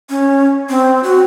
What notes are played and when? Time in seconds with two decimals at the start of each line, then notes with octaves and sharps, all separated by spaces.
0.10 C#4
0.70 C4
1.03 F#4